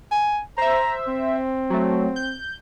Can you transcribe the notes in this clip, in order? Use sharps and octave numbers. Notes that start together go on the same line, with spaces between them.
G#5
C5 E5 A#5
C4
F#3 A3
G6